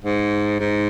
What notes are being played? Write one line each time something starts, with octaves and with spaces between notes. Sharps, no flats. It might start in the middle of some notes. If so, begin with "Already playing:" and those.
G#2
G#2